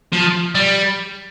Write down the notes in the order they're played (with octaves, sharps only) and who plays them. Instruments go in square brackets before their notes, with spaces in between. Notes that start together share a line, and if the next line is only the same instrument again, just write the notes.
[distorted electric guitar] F3
G3